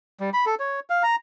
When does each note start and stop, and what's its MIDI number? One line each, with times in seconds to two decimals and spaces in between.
0.20 0.30 55
0.33 0.45 83
0.46 0.55 69
0.60 0.80 73
0.90 1.03 77
1.03 1.16 82